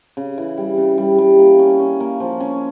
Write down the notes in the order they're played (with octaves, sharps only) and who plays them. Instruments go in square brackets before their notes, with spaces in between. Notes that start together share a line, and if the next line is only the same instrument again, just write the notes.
[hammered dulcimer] C#3
E3
G3
C#3
G3
G3
A#3
C#4
C#4
A#3
F3
C#4